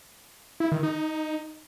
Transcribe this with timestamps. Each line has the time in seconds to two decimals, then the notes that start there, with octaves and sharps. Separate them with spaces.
0.60 E4
0.72 D#3
0.83 D#4